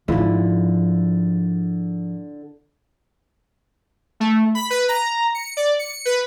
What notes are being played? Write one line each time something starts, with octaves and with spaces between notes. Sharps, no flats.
G#2 D3 F3 E4 F4
A3
B5
B4
A#5
C#7
D5
C#7
B4